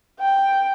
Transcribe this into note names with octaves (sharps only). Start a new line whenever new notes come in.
G5